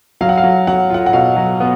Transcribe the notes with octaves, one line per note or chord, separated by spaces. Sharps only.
F#3 F5
F#5
F5
F#3
F#3 F#5
F4 F#5
F#5
B2 F5
F#3
B3